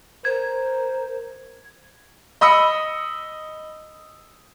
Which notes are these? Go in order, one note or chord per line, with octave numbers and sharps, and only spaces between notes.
A#4 C5 G#6
D#5 B5 D#6 E6 C#7